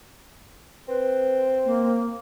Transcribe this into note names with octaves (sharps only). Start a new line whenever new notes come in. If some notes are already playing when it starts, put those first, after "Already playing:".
C4 B4
A#3